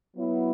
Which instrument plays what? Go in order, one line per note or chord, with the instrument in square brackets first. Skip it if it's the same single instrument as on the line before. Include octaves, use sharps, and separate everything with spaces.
[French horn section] F#3 B3 E4